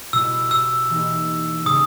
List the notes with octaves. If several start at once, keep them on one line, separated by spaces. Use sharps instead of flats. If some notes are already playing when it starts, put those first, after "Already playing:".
B2 G3 B3 E4 E6
E6
E3 A#3 D#4 G4
C#3 E3 G3 C#4 D#6